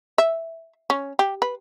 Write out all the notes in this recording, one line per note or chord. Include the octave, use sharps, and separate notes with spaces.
E5
C#4
G4
B4